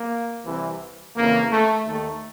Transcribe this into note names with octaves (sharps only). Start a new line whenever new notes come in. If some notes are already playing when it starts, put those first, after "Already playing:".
Already playing: A#3
C2 C3 E3
F2 C#3 E3 A#3
A3
D#2 D#3 A3